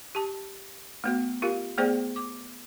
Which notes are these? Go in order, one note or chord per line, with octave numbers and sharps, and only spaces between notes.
G4 A5
A3 B3 F#4
F4 G4 A#4 F5
A3 B3 G#4 C5 D5 G5
D6